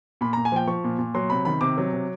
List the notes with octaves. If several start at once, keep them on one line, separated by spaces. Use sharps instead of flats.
A#2 B5
A#2 A#5
G#5
F3 G5
F3 C#6
A#2
A#2
F#3 C6
C3 B5
D#3 B5
C3 D6
F#3
C3